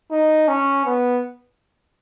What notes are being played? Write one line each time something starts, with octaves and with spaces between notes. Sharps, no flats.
D#4
C#4
B3